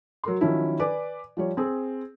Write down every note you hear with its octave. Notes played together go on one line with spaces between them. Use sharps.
F#3 A#4 C6
D#3 F3 F#3 C#4 E4
B4 D5 G#5 D6
F3 G3 C#5
C4 G#4